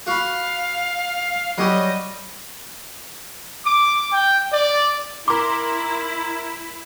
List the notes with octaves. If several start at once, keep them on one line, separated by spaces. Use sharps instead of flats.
F#4 F5 B5
F#3 G3 G4 D#5
D6
G5
D5
E4 A#4 C6 D6